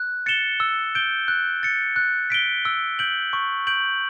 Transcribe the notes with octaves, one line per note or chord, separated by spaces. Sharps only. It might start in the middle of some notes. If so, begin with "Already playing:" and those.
Already playing: F#6
A6 C#7 E7 G7
E6
G6 D7 G7
F#6
A6 C#7
F#6
B6 D7 G7
E6
G6 D7 F#7
C#6
G6 D7 F#7